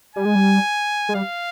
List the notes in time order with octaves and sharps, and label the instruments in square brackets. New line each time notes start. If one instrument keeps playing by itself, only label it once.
[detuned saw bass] G3 [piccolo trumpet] G#5
[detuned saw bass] G#3
G3
G#3
[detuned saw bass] G3 [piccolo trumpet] F5